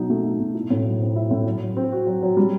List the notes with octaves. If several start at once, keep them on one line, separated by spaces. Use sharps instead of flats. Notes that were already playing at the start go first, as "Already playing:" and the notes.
Already playing: B2 F#3 D#4
A3
D#4
B2
E4
A2
F#3
C4
E4
A2
F#3
F#3
C4
F#4
F#3
F#3
G3